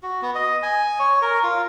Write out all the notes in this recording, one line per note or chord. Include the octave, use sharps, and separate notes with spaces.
F#4
B3
D#5
G#5
C#5
A#4
F4